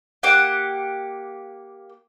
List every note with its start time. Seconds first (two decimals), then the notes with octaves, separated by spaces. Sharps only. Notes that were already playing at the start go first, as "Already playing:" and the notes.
0.23 A#3 G4 F#5